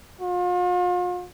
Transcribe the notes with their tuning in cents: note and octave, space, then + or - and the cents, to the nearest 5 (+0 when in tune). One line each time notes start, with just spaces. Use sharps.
F4 +40